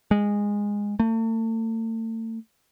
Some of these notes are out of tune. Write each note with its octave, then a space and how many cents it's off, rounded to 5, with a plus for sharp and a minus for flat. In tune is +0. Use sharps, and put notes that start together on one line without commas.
G#3 -15
A3 +40